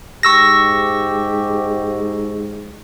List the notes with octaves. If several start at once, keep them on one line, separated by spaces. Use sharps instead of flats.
G#2 G4 C#6 E6 A#6